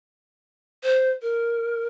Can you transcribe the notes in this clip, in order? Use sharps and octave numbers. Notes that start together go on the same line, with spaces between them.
C5
A#4